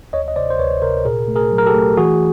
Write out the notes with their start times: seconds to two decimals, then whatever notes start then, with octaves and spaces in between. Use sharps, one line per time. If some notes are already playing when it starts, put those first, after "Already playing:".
0.13 D2 C#5 D#5
0.28 D#5
0.36 C3 C5 D5
0.50 C5
0.59 D2 B4 C#5
0.82 C3 A#4 C5
1.05 A#2 G#4 A#4
1.28 A3
1.36 G#4 A#4
1.52 F#3
1.58 A#4
1.66 G4 A4
1.75 A3
1.97 E3 F#4 G#4